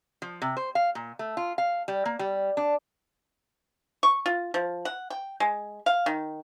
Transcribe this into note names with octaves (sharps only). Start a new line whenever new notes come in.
F3
C3
C5
F5
A#2
A3
F4
F5
G3
A#3
G3
D4
C#6
F4
F3
F#5
G5
G#3
F5
D#3